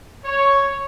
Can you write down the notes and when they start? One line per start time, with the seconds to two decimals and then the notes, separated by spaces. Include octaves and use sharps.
0.24 C#5